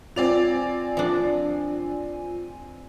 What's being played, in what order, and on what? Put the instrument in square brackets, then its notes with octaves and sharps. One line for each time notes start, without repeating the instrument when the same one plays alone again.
[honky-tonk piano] C4 D5 F7 [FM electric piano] F4 G#5
[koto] F3 D4